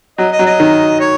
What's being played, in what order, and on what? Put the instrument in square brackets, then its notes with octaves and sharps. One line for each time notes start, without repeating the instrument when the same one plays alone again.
[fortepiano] F#3 [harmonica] D#5
[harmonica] D#5
[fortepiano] F#3
[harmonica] D#5
[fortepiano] D#3
[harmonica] C#5